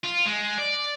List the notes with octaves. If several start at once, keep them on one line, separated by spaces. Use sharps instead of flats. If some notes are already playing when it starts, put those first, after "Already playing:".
F4
G#3
D5